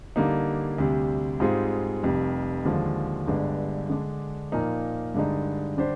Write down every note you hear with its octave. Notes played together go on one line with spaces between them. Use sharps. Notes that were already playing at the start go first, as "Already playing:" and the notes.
D3 G3 A#3 D#4
D2 C3 G3
G#2 G3 C4 F4 G#4
F1 F2 C3 G3
D#2 D3 F3 G#3
G1 G2 D3 G#3
D3 G#3 D4
A#2 F3 A#3 D#4 A#4
G2 D3 G#3 D#4
D3 G3 D4 G4 C5